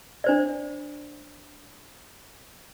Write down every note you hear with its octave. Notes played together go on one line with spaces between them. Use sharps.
D4 C5 D5